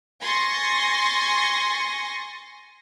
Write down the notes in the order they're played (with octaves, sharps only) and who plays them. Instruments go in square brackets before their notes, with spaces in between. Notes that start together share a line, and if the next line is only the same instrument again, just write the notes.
[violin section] G#5 C6 C#6 A6 A#6